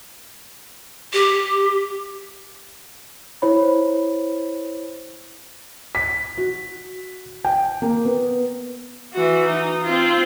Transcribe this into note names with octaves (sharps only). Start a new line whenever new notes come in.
G4
E4 C5 C#5 B5
B6
F#4
G5
A#3
B3
E3 F#4
D#4
C4 F4